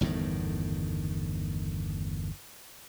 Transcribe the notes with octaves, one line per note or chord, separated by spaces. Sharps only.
G1 E2 A2 D#3